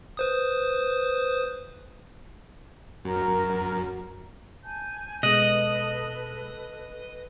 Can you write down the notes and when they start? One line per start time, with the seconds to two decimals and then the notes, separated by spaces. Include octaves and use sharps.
0.17 B4 C5 D#6
3.05 F#2 F#3 F#4 A#4 A#5
4.64 G#5 A5 G6
5.23 B2 G#3 A4 B4 D#5 F#6 D#7 F#7